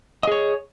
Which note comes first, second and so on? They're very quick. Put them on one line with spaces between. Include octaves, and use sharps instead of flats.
D#5 G#4 C#5